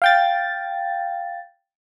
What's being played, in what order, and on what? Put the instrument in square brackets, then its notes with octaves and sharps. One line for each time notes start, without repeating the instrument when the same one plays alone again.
[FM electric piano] F5 G5 A6